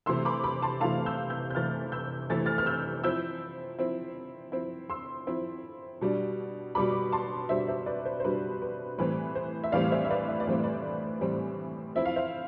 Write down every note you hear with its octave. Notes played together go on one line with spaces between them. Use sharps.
C3 E3 A3 E4 C6 E6
B5 D6
B5 D6
A5 C6
C3 E3 A3 E4 F5 A5
E6 G6
E6 G6
G6
C3 E3 A3 E4 F6 A6
E6 G6
C3 E3 A3 E4 A6
F6 A6
F6
E6 G6
F3 C4 E4 E6 G6
F3 C4 E4
F3 C4 E4
C6 E6
F3 C4 E4
B2 G3 D4
B2 G3 D4 B5 D6
A5 C6
B2 G3 D4 C5 E5
C5 E5
B4 D5
C5
C5
B2 G3 D4 B4
B4
A2 E3 G3 C4 B4
C5
E5
A2 E3 G3 C4 D5 F5
C5 E5
E5
B4 D5
E5
D5
A2 E3 G3 C4 C5
B4 D5
A2 E3 G3 C4
F3 C4 E4 E5
F5
C5 E5